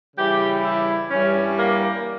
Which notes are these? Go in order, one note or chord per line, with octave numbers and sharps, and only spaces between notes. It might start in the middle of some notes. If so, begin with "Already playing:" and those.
C#3 E3 G3 G4
E4
G2 E3 G3 C#4
A#3